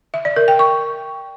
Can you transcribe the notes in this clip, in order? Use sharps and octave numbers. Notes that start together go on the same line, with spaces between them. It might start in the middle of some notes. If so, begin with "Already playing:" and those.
E5
D5
A#4
G5
C#6